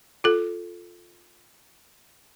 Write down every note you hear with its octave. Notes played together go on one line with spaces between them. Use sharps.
F4 A4